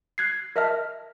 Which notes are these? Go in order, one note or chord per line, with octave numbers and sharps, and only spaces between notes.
F#6 G#6 C7
A#4 D#5 E5 A5 F6